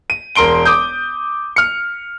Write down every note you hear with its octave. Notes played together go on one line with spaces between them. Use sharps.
D#7
E1 A#4 C6 D7 G7
D6 D#6 G6
F6 C#7